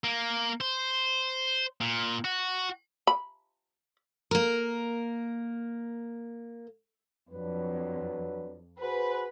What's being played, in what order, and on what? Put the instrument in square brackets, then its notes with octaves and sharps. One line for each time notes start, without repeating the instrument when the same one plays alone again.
[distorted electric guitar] A#3
C5
A#2
F#4
[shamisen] B5
[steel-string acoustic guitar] A#3 A#4
[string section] F2 [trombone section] F#3 D4 B4
[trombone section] F#4 G#4 C5 [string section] B4